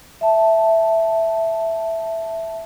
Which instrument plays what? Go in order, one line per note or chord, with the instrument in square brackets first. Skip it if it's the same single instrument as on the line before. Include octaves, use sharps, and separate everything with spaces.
[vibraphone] E5 A5